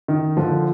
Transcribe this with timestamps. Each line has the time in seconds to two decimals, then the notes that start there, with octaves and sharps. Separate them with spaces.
0.08 D#3
0.37 D3 F3